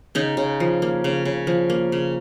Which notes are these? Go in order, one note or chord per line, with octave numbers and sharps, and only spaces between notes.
C#3 D#4
C#3
F3
A#3
C#3
C#3
F3
A#3
C#3